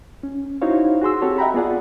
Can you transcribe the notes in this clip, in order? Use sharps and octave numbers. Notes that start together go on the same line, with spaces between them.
C#4
D#4 E4 F#4 C5 C#5 F5
F#4 G#4 C6 E6
C4 F#4 G4 A4 C#5
D#5 E5 F#5 G5 A#5 B5
B3 F4 G#4 D5 F#5